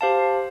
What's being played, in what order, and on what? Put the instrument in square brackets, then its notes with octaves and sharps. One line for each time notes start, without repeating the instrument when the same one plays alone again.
[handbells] G4 C5 F5 A5